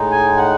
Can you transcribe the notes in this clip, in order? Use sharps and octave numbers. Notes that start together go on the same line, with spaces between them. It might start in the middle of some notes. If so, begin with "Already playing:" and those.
Already playing: A2 G#3 D#4
G#5
F#5